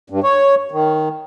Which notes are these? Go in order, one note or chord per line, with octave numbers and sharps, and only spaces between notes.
G2
C#5
D#3